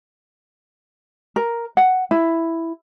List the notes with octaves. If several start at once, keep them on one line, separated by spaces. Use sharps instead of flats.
A#4
F#5
E4